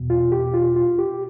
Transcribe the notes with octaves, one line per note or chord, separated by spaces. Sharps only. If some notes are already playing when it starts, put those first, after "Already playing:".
Already playing: E2 B2
F4
G4
F4
F4
G4